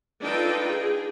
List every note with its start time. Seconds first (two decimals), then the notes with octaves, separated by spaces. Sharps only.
0.21 D4 D#4 F4 A4 B4 G5
0.68 G#4